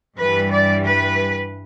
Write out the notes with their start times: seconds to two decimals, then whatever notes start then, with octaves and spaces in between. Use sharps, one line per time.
0.18 G2 E3 G3 B4
0.52 D5
0.86 B4